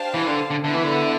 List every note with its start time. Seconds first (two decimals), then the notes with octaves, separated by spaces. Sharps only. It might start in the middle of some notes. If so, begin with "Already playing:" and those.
Already playing: D4 G4 C5 F5 A5
0.14 E3
0.27 D3
0.50 D3
0.64 D3 B3 E4 B4 E5
0.74 E3
0.84 D3